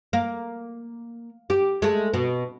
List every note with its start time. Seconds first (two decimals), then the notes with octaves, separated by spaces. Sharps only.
0.13 A#3
1.50 G4
1.82 G#3 A3
2.14 B2